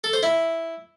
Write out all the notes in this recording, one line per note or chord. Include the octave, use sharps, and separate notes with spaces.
A4
C5
E4